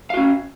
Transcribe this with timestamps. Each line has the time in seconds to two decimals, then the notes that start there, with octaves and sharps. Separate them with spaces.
0.10 F5
0.14 F#4
0.17 C#4